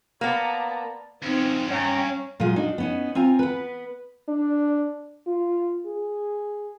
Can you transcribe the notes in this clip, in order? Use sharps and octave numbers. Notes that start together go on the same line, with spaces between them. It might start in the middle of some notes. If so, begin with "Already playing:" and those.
A#3 B3 D5 A5 A#5
F2 C4 C#4 D#4
G2 C#4 G5 A#5
A#2 F#3 G#3 F4 G#4
D4 D#4 F#4
B3 C#4 D#4
C4 F4 G#5 A#5
B3 B4
D4
F4
G#4